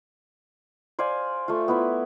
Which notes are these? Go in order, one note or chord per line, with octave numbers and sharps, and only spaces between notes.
C5 D5 F5 G#5
A3 F4
B3 E4 B4